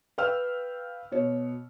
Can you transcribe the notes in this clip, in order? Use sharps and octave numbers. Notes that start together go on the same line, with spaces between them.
B4 F5 G5 E6 F6
B2 C#5